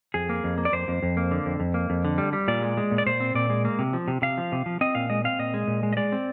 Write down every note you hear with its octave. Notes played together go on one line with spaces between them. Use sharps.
F2 G#4
A#3
F2
A#3
D5
F2 C5
F2
F2
A#3
D3
F2
F2
A#3
F2
D3
G3
G3
A#2 D5
G#3
G#3
A#2
D5
A#2 C5
C4
A#2 D5
G#3
A#3
C3
F3
C3
C3 F5
F3
C3
F3
C4 D#5
A#2 F5
G#3 D#5
C4 F5
A#2 D#5
G#3
A#2
G#3
D#5
G#3 D5
C4